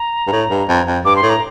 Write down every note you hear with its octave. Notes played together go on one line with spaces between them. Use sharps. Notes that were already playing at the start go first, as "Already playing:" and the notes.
Already playing: A#5
G2
A2
G2
F2
F2
G2 D6
C6
A2
A#5